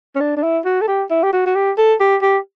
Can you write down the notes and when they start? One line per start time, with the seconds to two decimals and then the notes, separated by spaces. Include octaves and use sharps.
0.16 C#4
0.21 D4
0.37 D4
0.43 E4
0.65 F#4
0.81 A4
0.88 G4
1.10 E4
1.23 G4
1.33 F#4
1.46 F#4
1.56 G4
1.78 A4
2.00 G4
2.22 G4